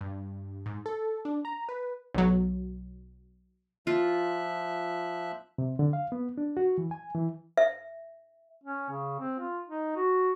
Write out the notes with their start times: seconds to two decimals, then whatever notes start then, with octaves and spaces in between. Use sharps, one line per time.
0.01 G2
0.66 G#2
0.86 A4
1.25 D4
1.45 A#5
1.69 B4
2.15 B1 F#3
3.87 F3 F4 E5 F#6
5.58 C3
5.79 D3
5.93 F5
6.12 B3
6.38 D4
6.57 F#4
6.78 E3
6.91 G#5
7.15 E3
7.57 E5
8.63 C#4
8.90 C#3
9.20 C4
9.39 F4
9.68 D#4
9.96 F#4